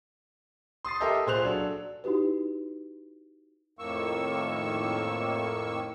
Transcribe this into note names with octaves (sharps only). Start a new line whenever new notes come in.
C6 D#6 A6 C7
G4 A4 A#4 D#5 E5 G6
A#2 G#4 C5 C6 F#6 F7
F#3 D4 A4
D#4 E4 F#4 G4 B4
F2 A2 D#3 A#3 C#6 E6